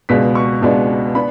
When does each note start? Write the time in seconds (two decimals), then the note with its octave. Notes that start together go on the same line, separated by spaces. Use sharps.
0.09 C#2 B2 G#3 B3 D4 B6
0.35 C#6
0.62 C#2 B2 G#3 B3 D4
1.15 B3 D4 B5